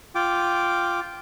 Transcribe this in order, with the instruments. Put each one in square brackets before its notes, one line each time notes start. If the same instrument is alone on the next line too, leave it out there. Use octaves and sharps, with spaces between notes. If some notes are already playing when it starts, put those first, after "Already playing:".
[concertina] F4 G5 D6